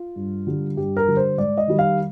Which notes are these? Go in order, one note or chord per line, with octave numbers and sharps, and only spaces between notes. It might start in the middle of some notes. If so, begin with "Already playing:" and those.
Already playing: F4
G2
D3 G3
G2 G4
A#4
D3 G3
C5
G#2 D5
D#5
D#3 G3
F5